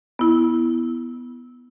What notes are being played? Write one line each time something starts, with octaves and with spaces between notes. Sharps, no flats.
B3 E4